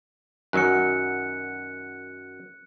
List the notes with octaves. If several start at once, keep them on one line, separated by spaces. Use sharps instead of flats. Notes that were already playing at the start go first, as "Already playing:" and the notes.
F#2 D#3 F#3 F#6 C#7